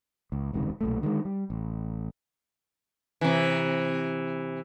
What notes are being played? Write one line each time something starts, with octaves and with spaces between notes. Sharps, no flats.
C#2
E1 C#2 C3 D#3
B1 A#2 A3
D3 D#3 F#3 G#3
G3
A1
C3 E3